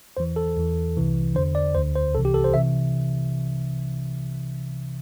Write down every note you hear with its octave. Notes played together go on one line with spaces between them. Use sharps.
E2 E3 C5
A4
E2 E3
C2 C3 E3
E2 D3 C5
D5
D2 D3 C5
C5
C2 C3 E3 A4
G4
A4
C5
C3 E3 E5